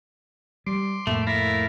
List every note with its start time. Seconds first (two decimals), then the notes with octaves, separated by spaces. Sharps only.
0.67 G3 C6 D6
1.07 F2 A2 A3 A#3
1.27 A3 E4 A#4 F5